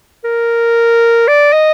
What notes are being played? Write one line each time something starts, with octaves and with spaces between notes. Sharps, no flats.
A#4
D5
D#5